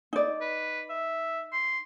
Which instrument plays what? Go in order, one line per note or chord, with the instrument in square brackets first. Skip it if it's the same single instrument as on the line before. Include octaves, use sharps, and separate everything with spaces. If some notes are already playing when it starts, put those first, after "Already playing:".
[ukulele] D#4 D5
[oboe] B4
E5
C6